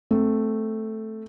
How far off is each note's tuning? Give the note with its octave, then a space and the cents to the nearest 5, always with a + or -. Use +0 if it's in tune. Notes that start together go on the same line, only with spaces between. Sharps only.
A3 +0 C4 +0